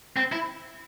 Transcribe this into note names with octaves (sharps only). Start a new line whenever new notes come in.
C4
E4